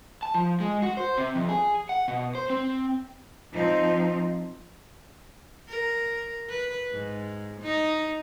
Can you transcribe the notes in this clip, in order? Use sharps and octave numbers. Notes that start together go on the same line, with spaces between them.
A5
F3
G#3
F#4
C5
C3
F2
G#4
F#5
B2
C5
C4
F3 C4 D#4
A#4
B4
G#2
D#4